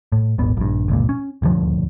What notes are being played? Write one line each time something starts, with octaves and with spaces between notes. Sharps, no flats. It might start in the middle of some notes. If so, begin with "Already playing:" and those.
A2
D#1 G#1 B3
A#1 G2
G1 C#2 A#2
C#4
D#1 D2 G2 F3